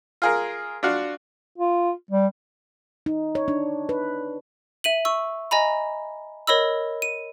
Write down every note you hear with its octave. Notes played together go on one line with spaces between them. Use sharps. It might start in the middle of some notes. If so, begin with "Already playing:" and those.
F4 G#4 A#4
D4 F4 F#4 F5
F4
G3
D#4
C#5
D4
B4
E5 D#7 F#7
C#6 E6
D#5 G#5 A#5 B5
A#4 C#5 D#5 B5 E6
D#7